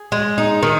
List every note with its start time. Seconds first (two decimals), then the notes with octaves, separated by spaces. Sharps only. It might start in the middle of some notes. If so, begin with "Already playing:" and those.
Already playing: G#4
0.12 G#3
0.38 D#4
0.63 D#3